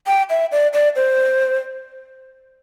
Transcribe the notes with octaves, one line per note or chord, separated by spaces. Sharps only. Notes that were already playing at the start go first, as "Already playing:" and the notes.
G5
E5
D5
D5
C5